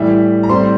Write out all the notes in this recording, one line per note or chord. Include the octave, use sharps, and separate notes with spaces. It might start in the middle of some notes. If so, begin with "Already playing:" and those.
Already playing: A2 E3 G3 E5
A#5
A2 G3 C4 C5 C6